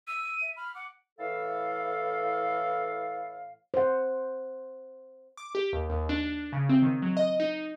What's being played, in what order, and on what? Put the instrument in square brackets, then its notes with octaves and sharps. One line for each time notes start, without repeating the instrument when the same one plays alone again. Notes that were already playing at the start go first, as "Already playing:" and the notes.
[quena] E6 [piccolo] D#7
[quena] E5
[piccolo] B5 [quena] F6
[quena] F#5 [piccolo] D6
[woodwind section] A2 E3 A4 F5
[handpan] C5 F#5
[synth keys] D6
G4
D#2
D#2
D4
C#3
C4
D#3
F#3
D#5
D#4